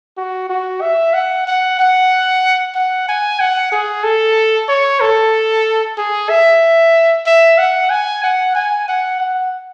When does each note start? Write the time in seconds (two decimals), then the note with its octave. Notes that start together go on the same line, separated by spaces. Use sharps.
0.18 F#4
0.49 F#4
0.82 E5
1.14 F#5
1.47 F#5
1.79 F#5
2.75 F#5
3.08 G#5
3.40 F#5
3.72 G#4
4.04 A4
4.69 C#5
5.01 A4
5.98 G#4
6.29 E5
7.26 E5
7.58 F#5
7.90 G#5
8.23 F#5
8.55 G#5
8.88 F#5
9.20 F#5